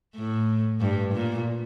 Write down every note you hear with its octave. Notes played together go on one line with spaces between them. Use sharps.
A2
G2
A#2